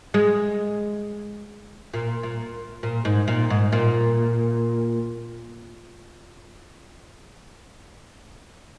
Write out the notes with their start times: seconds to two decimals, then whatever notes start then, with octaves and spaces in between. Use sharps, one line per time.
0.14 G#3
1.94 A#2
2.23 A#2
2.83 A#2
3.05 G#2
3.28 A#2
3.50 G#2
3.72 A#2